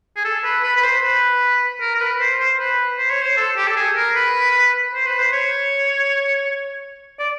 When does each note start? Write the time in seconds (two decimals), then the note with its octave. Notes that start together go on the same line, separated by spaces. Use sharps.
0.16 G#4
0.25 A4
0.44 B4
0.63 B4
0.77 B4
0.84 C5
1.04 B4
1.81 A#4
1.95 A#4
2.01 B4
2.20 C5
2.40 C5
2.59 B4
2.98 C5
3.10 C#5
3.22 C5
3.37 A4
3.56 G4
3.68 A4
3.76 G#4
3.96 A#4
4.15 B4
4.94 C5
5.06 B4
5.19 C5
5.33 C#5
7.19 D5